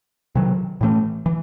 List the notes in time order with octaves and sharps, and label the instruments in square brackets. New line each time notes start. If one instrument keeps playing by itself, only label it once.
[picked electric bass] C3 D#3 F#3
A2 E3 A3
E3